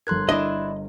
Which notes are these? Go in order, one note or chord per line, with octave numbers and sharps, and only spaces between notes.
G1 A4 A#4 C6 F#6 G#6
D4 E4 D#5